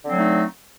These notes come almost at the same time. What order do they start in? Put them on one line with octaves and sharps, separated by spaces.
D3 C4 F#3 A3 D#4